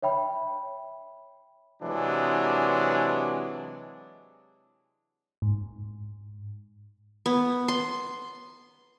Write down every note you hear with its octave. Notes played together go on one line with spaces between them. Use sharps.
C#5 E5 G5 B5
C3 E3 F#3 G#3 D4
G#2
B3
C6